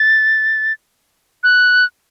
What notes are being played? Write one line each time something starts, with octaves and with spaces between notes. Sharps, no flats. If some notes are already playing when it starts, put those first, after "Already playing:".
Already playing: A6
F#6